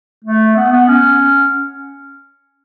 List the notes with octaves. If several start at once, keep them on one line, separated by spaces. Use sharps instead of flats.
A3
B3
B3
C#4